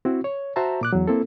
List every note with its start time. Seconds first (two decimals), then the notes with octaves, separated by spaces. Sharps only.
0.05 C4 E4 F#4
0.24 C#5
0.56 F#4 C5 E5 A5 A#5
0.81 A#2 D6 F#6
0.93 E2 F#3
1.07 A#3 C4 E4 A4